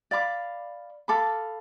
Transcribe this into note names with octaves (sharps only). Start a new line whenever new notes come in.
D5 F5 B5 D6
A4 F5 B5 D6